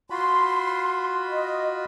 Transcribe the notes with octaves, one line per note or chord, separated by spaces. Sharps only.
F4 F#4 B5 C6
D#5